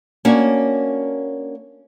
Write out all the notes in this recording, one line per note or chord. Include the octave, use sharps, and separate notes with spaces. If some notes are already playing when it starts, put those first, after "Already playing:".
A#3 C#4 D4 F#4